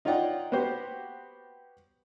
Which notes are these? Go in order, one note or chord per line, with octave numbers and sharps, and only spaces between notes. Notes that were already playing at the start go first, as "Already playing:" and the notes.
D#4 F4 C#5 D5 F#5 G5
B3 F#4 G4 C5